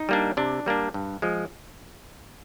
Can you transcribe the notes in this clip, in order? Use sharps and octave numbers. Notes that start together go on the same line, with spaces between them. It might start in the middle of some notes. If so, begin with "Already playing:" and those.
Already playing: D#4
G3 A#3 D4
C3 D4
G3 A#3 D4
G2
F3 G#3